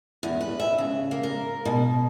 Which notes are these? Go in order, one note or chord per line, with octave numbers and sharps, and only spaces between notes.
E2
B4
E5
C#3
A#3
A#4
B2